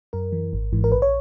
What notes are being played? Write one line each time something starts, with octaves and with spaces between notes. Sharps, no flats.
F#2 A#4
E3
G#1
G#2 E3
A#4
A#1 B4
C#5